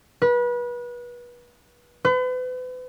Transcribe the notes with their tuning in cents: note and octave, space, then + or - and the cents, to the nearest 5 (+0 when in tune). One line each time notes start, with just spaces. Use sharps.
B4 -30
B4 +40